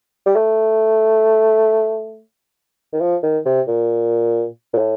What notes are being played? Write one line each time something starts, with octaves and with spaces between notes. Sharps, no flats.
G3
A3
D#3
F3
D#3
C3
A#2
A#2
A2